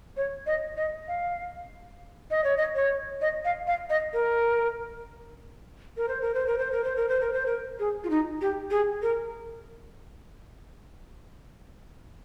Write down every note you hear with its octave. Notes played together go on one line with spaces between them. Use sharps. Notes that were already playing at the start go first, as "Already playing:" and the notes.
C#5
D#5
D#5
F5
D#5
C#5
D#5
C#5
D#5
F5
F5
D#5
A#4
A#4
C5
A#4
C5
A#4
C5
A#4
C5
A#4
C5
A#4
C5
A#4
G#4
F4
D#4
G4
G#4
A#4